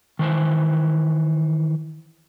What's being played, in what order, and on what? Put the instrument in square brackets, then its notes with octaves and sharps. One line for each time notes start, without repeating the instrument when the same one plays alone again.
[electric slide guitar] D#3 E3 C5